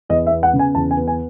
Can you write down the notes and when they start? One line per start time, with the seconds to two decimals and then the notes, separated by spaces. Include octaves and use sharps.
0.09 E2 D#5
0.26 E5
0.31 B3
0.43 F#5
0.53 C#3
0.59 G#5
0.75 E2 A5
0.91 G#5
0.97 B3
1.08 G#5